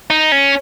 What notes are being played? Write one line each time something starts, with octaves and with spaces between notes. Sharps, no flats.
D#4
C#4